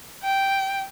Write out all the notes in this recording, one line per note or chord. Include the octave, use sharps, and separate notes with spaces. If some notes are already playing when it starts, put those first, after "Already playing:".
G5